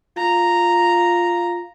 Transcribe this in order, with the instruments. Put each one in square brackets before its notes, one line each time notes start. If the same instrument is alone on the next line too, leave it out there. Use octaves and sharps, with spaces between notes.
[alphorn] F4 [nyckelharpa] A#5